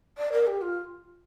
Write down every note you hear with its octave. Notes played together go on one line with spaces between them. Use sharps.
D5
A#4
G4
F4